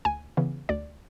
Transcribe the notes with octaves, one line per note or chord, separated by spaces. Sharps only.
D2 G#5
C#3 E3 B3
D2 D5